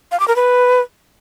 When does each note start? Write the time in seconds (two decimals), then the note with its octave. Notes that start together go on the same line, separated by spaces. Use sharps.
0.12 F5
0.20 D6
0.28 A#4
0.36 B4